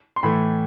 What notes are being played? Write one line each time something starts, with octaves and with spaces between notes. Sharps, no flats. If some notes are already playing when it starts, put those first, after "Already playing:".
C6
A2 E3 A3 B5